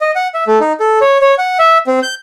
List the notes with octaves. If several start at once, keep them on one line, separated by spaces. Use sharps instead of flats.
D#5
F#5
E5
A3
D#4
A4
C#5
C#5
F#5
E5
C4
G6